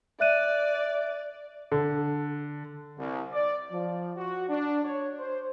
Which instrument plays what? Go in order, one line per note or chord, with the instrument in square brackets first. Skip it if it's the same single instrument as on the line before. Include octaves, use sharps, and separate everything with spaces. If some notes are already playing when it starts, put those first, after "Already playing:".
[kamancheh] D5 [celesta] E5 F#6 D#7
[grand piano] D3
[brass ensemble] C2
D5
F3
F#4
D4
C#5
C5